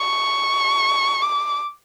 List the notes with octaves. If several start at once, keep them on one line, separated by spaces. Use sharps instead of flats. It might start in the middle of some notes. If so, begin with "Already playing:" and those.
Already playing: C#6
D6